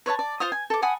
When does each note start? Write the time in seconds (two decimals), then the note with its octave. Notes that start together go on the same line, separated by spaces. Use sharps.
0.06 B4 C#5 E5 A5
0.19 D5
0.40 F4 C5 F5 D#6
0.52 G#5
0.70 A4 D6
0.82 F#5 G#5 B5 D#6